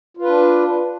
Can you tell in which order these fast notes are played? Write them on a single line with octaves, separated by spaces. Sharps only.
F4 B4 D4